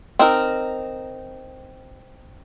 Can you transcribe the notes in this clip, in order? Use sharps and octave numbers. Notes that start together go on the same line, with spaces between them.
C4 D#4 A#4